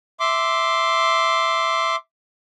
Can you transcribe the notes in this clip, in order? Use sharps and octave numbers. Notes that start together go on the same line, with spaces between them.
E5 C6 D6